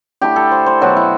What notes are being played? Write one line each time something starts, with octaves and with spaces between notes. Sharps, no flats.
D3 A3 E4 G4
A4
C5
C5
B2 F#3 B3 F#4
E4